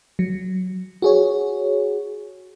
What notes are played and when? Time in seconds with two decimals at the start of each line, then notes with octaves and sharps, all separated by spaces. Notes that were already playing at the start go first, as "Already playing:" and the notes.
0.19 F#3
1.02 F#4 G#4 C#5